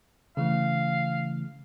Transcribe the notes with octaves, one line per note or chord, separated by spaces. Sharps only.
C#3 E3 A3 F5